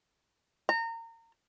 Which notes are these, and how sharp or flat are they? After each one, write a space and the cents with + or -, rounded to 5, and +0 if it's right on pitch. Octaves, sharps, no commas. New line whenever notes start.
A#5 -30